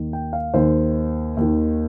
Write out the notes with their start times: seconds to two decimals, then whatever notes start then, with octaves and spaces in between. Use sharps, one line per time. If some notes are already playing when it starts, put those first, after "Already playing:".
Already playing: D#2 D#3
0.13 G5
0.33 F5
0.54 D#2 D#3 C5
1.37 D#2 D#3